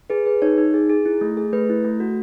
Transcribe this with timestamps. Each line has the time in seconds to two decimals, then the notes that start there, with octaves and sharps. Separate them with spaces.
0.10 G#4 B4
0.26 G#4 B4
0.42 D#4 C#5
0.58 D#4
0.74 G#4
0.89 G#4
1.05 E4
1.21 A3
1.37 G#4
1.53 A3 B4
1.70 E4
1.84 A3
2.00 F#4